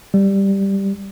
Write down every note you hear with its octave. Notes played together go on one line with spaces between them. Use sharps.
G3